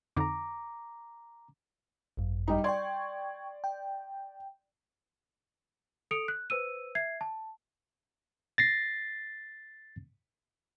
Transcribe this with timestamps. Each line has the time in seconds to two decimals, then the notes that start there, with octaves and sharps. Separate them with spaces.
0.17 F2 D3 D#4 A#5 D6
2.17 G#1 F#2
2.48 G3 D#4
2.64 D5 G5 C6 C#6 G#6
3.64 G5
6.11 A4 D#6 C#7 D7 F7
6.28 F#6
6.50 B4 C5 E6 D#7
6.95 E5 G#6 C7
7.21 A5
8.58 A6 A#6 C7